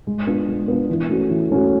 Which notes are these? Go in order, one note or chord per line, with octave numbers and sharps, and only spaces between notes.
G#3
B3 D4 F4
G#3
B3 D4 F4
E3
A3 C#4 F#4
E3
A3 C#4 F#4